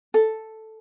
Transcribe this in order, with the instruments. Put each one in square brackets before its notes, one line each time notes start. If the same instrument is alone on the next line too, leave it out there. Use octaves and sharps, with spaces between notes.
[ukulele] A4